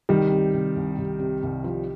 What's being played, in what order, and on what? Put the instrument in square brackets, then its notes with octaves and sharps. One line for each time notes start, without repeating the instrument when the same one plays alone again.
[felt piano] C2 [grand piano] D#3 G3
[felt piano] C3
C3
C2
C2
C3
C2
F3